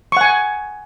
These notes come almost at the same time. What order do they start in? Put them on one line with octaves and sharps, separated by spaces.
C#6 F#5 G#5